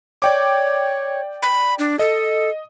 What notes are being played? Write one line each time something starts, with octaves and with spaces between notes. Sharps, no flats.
C#5 D5 G5 D6
B5
D4
A4 D#5